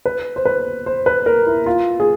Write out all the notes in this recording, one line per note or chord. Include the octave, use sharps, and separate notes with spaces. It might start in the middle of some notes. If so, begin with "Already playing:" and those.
B4
C5
B4
C5
B4
A#4
E4
F4
G#4